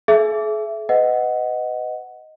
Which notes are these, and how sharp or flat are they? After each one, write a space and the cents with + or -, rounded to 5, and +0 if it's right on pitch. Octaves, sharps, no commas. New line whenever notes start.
G#4 +45 E5 +15
B4 +30 D#5 +5 F#5 +0